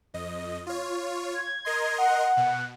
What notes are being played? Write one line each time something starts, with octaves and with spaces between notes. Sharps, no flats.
F2 D#5
F4 C#5
G#6
A#4 D#5 C6
F#5
B2